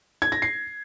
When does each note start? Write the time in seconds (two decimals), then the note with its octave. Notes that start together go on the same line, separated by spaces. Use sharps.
0.22 G#6
0.32 A#6
0.42 C7